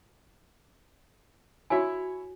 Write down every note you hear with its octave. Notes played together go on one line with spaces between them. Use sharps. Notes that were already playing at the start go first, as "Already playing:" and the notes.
E4 F#4 C#5 E5 G#5